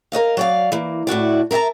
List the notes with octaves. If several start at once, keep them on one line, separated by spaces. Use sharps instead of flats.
A#4 C5 D#5 F5
F#3 D5 F5
E3 A#3
A2 E4 F#4 D5
A#4 E5 F#5 A5 A#5